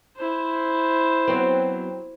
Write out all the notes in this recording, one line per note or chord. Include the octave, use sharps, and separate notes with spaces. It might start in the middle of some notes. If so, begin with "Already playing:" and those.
E4 C5
F#3 B3 C4